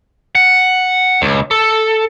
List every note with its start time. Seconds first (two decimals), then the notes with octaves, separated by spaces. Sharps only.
0.35 F#5
1.22 C#2
1.51 A4